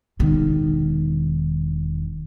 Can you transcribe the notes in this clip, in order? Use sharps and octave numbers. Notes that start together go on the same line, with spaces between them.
E1 D#3